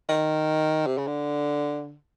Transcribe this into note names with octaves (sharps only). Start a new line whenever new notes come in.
D#3
C3
C#3
D3